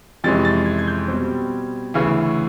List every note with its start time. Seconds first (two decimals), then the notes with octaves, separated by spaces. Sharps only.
0.24 F2 C3 E3 G#3 C#4 A6
0.45 A6
0.66 G#6
0.79 G#6
0.87 G6
1.08 B2 G3 C4
1.94 D2 C#3 E3